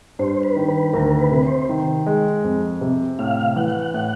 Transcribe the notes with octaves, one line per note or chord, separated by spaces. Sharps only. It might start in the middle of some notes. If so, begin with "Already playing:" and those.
G2 C5
B4
D#3
B4
D2 A#4
B4
C3
C5
D#3
G#3
F2
C3
A2 F5
E3 F#5
A2 F#5